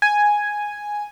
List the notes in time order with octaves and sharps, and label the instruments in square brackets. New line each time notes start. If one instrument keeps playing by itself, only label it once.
[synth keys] G#5